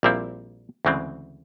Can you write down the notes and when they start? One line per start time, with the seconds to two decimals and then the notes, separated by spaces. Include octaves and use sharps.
0.03 A#1 A#2 G3 C4 E4
0.85 D2 C#3 E3 G#3 C4